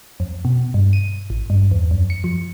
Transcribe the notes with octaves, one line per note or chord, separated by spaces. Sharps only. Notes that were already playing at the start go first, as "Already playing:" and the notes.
F2
B2
G2
D#7
A1
G2
E2
F#2
C#7
F3